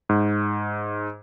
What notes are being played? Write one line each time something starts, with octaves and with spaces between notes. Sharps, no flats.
G#2